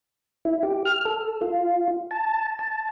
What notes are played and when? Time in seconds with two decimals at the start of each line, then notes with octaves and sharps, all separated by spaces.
0.45 E4
0.63 G4
0.85 F6
1.05 A4
1.41 F4
2.11 A5
2.59 A5